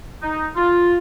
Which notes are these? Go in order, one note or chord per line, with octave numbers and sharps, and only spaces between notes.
D#4
F4